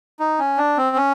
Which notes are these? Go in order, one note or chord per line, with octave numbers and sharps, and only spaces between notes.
D#4
C#4
D4
C4
C#4